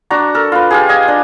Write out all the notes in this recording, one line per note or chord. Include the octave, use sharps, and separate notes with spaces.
D4 F#4 A#5
A4 A#4
F4 B4
F4 G4 G#4
D#5 G#5
D4